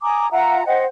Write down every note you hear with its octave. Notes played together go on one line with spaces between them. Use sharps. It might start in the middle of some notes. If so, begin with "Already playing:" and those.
G#5 A#5 D6 D#6
F4 E5 F#5 A#5
C5 D#5 F#5 G5